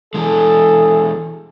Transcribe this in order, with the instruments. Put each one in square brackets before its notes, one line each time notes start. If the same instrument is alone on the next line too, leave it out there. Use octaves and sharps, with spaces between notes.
[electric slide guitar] E3 G#3 [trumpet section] G#4 A4